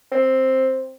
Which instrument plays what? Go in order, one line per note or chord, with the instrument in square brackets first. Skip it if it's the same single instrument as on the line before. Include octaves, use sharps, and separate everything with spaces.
[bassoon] C4